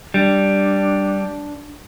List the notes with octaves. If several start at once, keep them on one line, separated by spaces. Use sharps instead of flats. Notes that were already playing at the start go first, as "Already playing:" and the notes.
G3 D4